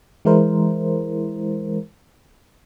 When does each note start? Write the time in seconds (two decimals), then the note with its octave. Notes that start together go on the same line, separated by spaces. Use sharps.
0.25 E3 G#3 E4 A#4 C5